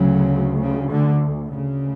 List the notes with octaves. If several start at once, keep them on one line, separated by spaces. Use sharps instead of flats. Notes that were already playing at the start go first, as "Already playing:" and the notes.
Already playing: D2 C#3 F#3
C#3
D3
D2 C#3